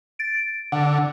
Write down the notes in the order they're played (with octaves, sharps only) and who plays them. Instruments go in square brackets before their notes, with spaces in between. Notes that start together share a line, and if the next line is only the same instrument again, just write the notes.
[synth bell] A6 D7
[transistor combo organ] D3 [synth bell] F#5